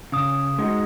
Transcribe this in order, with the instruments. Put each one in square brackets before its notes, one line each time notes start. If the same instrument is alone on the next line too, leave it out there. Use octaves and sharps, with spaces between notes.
[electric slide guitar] C#3 [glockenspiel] D#6
[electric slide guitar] G#3 D#4 F#4